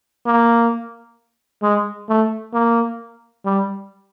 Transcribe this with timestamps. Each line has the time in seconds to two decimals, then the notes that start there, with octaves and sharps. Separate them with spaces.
0.26 A#3
1.62 G#3
2.09 A3
2.53 A#3
3.45 G3